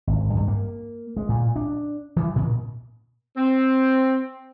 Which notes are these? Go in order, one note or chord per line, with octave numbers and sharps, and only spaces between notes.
G#1
G2
A#3
G#3
A#2
D4
E3
A#2
C4